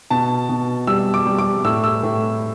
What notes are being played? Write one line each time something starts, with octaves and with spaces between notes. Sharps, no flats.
B2 A5
B2
G3 E6
D6
G3
D6
A2 E6
E6
A2